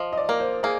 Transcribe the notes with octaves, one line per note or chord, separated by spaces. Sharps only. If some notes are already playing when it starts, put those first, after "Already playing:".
Already playing: F3 D#5
D#5
D5
A#3 A#4
C5
A#3 G#4